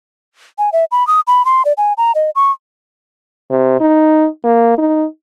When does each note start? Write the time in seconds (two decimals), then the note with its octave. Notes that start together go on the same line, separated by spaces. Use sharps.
0.58 G#5
0.73 E5
0.92 B5
1.07 D#6
1.27 B5
1.45 C6
1.65 D5
1.78 G#5
1.98 A#5
2.15 D#5
2.35 C#6
3.51 C3
3.81 D#4
4.44 A#3
4.78 D#4